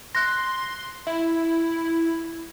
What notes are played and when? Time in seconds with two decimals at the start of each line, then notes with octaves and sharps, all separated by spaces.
0.15 C6 F#6 A#6
1.07 E4 E5